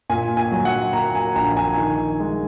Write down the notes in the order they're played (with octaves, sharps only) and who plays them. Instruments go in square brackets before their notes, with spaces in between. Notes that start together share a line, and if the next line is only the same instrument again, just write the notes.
[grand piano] A#2 G#5
G#5
F#3
F#5
A#3 A#5
G#5
A#1 A#5
G#5
D#3
G#3